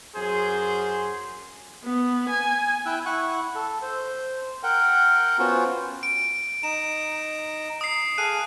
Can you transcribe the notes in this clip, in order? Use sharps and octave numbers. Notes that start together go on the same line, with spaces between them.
F#2 G#4 C5
B3
G#5
E4 G5 E6 F#6
E4 F#5 C#6 F#6
A4
C5
A#4 F#5 G5
B3 C#4 F4 F#4 C5
D7
D#4 A#5 E7
D#6 C7
G#4 A4 F5 F#6 D#7